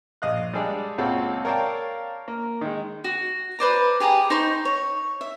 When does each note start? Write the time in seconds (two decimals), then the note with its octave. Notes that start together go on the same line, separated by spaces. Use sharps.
0.22 A#1 D#5 F5 F#6
0.53 G3 G#3 D4 G#4 A4 D5
0.98 C#2 A#2 C4 F#4 A4 C#5
1.45 A#4 C#5 D5 F5 G5 A5
2.28 A#3
2.61 D#3 G#3
3.04 F#4
3.59 B4 C5 D5 A#5
4.00 G4 G#4 B4 A#5
4.30 D#4 C5 C6 C#6
4.65 C#5
5.21 E5